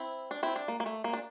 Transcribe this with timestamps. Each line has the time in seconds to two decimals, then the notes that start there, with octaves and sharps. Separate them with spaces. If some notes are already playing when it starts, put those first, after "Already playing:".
Already playing: C4 E4
0.31 D4
0.43 C4 E4
0.56 D4
0.68 A#3
0.80 A#3
0.86 A3
1.04 A#3
1.13 D4